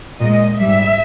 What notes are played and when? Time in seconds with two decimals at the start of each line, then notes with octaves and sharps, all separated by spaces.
0.21 A#2 G#3 D#5
0.59 G3 E5
0.64 G#2